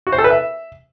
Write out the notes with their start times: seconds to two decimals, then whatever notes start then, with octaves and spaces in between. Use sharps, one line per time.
0.07 F#4
0.12 C5
0.18 A4
0.24 B4
0.30 E5